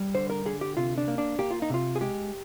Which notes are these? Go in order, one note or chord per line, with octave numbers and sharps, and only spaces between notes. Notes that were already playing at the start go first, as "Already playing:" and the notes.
Already playing: G3
D3 C5
A#4
D3 G#4
G4
C3 F4
D4
A#3
D4
A#3 G4
F4
D#4
C3 F4
G#4
G#3 G4